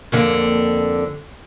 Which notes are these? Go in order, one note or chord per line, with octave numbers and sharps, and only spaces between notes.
F2 D3 A#3